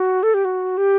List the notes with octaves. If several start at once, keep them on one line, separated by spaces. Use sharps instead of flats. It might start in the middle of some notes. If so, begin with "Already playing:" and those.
Already playing: F#4
A4
G4
F#4
G4